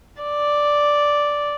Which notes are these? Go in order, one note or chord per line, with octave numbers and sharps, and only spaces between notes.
D5